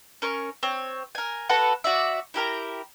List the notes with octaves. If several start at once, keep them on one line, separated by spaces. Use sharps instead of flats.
C#4 A#4 C#6
C4 C#5
A#4 G#5
F#4 A4 B4 F#5
F#4 D5 E5
E4 G4 A#4 A#5